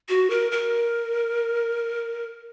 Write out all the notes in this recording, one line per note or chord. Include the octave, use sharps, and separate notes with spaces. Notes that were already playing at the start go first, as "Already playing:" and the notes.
F#4
A#4
A#4